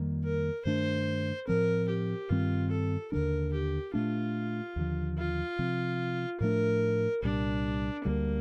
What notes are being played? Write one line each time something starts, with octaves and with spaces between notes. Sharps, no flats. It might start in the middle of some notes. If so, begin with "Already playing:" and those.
Already playing: F2 D#3 G3 A#3
A#4
G2 D#3 A3 D4 C5
A2 F3 C4 A#4
G4
G2 D#3 G3 C4 F4
A4
D#2 D3 G3 D4 A#4
G4
A#2 A3 D4 F4
D#2 D3 F3
F4
C3 F3 C4
A2 F3 A3 D4 A#4
C2 A#2 G3 D4
D2 D3 G3 A#3